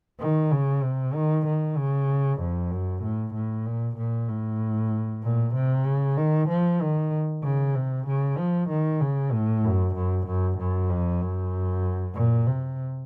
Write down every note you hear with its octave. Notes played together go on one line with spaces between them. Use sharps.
D#3
C#3
C3
D#3
D#3
C#3
F2
F#2
A2
A2
A#2
A#2
A2
A#2
C3
C#3
D#3
F3
D#3
C#3
C3
C#3
F3
D#3
C#3
A2
F#2
F#2
F#2
F#2
F2
F#2
A#2
C3